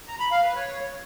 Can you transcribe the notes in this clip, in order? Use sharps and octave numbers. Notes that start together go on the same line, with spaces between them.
A#5
B5
F5
B4
C#5